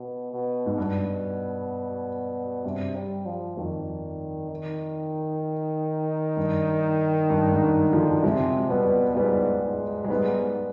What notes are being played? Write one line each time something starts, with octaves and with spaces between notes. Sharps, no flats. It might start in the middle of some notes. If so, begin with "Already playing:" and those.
Already playing: B2
B2
G#2
G2 B2
G2 C3
G3
F3
F2 D#3
D#3
G2
G2
G#2
G2
D3 F3
C3 F3 G#3
B2 G3 B3
G#2 G3 B3
G#2
G#3
G#2 G3 B3